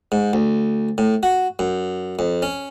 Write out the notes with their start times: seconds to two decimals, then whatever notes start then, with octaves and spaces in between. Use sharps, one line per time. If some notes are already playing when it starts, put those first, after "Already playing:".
0.12 G#2
0.33 D2
0.98 A2
1.23 F#4
1.59 F#2
2.19 F2
2.42 C#4